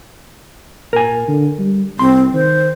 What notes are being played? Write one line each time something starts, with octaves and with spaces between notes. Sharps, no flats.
A#2 A#4 G#5
D3
G3
C2 C4 C6
D#3 C5